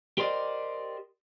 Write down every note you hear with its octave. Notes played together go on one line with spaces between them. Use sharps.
G4 A#4 C5 D5 D#5